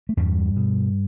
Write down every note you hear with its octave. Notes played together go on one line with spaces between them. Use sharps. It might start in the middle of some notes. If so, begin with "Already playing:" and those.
A3
E2 G2 G3
B2